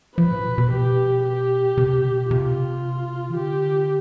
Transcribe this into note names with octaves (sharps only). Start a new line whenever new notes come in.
F3 B4
A2
B2
B2
G4
G4
C3
B2
C3 F4
E3
D3 G4